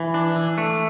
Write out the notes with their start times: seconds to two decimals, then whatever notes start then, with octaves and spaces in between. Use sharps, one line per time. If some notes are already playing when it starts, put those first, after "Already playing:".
Already playing: E3
0.14 D4
0.36 E3
0.58 A3